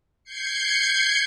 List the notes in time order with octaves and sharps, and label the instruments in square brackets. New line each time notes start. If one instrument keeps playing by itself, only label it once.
[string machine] G6 G#6 C7 C#7